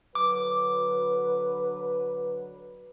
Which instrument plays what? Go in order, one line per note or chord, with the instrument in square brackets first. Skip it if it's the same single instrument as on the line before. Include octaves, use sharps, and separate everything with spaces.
[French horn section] D3 F#3 B4 [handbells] D6